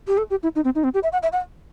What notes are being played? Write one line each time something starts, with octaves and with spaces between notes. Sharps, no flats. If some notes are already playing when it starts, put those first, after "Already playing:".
G4
A4
G4
E4
D#4
C4
D#4
C4
G4
E5
F#5
E5
F#5